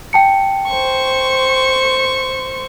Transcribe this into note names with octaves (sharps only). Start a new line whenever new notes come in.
G5 A5 C#7
C5 C#6